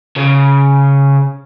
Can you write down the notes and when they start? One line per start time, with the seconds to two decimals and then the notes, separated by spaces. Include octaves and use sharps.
0.17 C#3